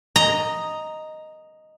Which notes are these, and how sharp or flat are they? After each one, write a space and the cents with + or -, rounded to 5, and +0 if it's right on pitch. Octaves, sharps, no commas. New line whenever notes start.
D#5 +0 A#5 +0